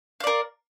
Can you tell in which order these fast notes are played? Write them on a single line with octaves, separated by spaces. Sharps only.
F5 D5 A#4